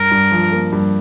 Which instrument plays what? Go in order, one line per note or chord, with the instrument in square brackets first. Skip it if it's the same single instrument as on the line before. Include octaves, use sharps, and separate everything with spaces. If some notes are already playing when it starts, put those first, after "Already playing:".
Already playing: [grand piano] G2 [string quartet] A#4
[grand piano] G2
F3
A#3
G2